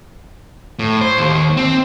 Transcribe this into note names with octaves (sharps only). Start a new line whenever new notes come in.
A2
C5
D#2
C4